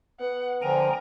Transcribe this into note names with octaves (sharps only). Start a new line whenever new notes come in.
B3 F#5
D3 F3 A#4 G5 G#5 A#5